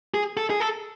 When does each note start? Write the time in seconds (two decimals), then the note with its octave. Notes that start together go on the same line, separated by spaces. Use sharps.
0.14 G#4
0.37 A4
0.50 G#4
0.60 A4